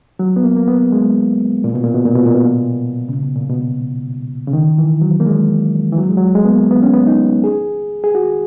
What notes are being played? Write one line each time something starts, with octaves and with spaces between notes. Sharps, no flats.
F#3
B3
A#3
A#3
B3
G#3
A#2
B2
A#2
B2
A#2
B2
A#2
B2
A#2
C#3
B2
A#2
B2
C#3
D#3
E3
F#3
A#3
G#3
E3
F#3
G#3
F#3
G#3
B3
A#3
B3
C#4
B3
D#4
G#4
G#4
F#4